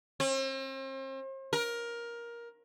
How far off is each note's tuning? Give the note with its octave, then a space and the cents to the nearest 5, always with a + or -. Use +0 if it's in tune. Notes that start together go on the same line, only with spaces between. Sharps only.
C4 +40
A#4 +15